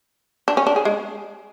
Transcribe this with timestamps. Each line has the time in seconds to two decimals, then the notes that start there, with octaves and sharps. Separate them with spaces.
0.48 D4
0.57 C#4
0.67 D4
0.76 G#4
0.85 G#3